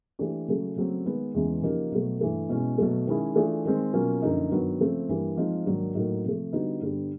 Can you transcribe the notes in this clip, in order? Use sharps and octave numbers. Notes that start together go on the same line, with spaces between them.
E3 A3 D4 G4
C#3 F#3 A3 C#4
C#3 F#3 A3 C4
D#3 G#3 B3
E2 C#3 E3 G#3 B3
C#3 F3 A#3 D#4 G4
B2 F#3 A3
G2 E3 A3
B2 G#3 C#4 E4
B2 F#3 A3
D#3 G#3 C#4 E4 G#4
E3 A3 D4 F4 G#4
D#3 G#3 C4
B2 F#3 A#3 C#4 F4
F#2 D3 F3 A#3 D#4
G2 D#3 F#3 B3
C#3 F3 A3 C4
G2 E3 G3 A#3
F3 G#3 C4 D#4
G#2 D#3 F#3 A#3 D4
A2 F#3 A#3 D#4
C3 F3 A3
D3 G3 B3 D#4 F#4
G2 D3 G3 B3